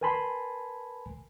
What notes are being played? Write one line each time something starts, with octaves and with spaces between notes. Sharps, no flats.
A#4 B4 G#5 A5 B5 C6